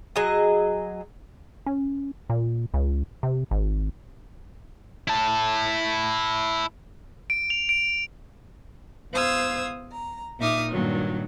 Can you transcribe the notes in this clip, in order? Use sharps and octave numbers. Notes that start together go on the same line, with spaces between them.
F#3 G#4 D#5
C#4
A#2
C#2
C3
G#1
E4 A5
D7
F7
D7
E2 C5 F5 D#6 E6 G#6
A#5
A#2 D#4 E5 D6 D#6 F6
G2 A#2 D#3 F#3